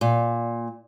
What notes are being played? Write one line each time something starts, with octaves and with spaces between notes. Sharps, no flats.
A#2